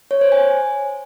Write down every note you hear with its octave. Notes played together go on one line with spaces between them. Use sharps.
C#5
C5
G#5